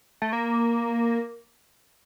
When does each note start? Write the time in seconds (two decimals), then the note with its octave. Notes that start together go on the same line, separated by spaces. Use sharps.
0.22 A3
0.33 A#3